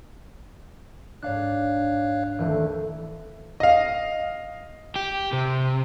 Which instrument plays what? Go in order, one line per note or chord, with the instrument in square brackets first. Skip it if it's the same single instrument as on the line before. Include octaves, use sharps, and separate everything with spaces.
[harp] G#2 D4 [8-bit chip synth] C#5 F5 F#6
[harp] D#1 E3 A3
[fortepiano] D#5 F5
[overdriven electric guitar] G4
C3